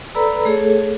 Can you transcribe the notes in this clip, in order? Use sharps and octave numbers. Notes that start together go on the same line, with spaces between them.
A4 B4 D5 A#5 B5 E6
A3 G#4 A4 C#5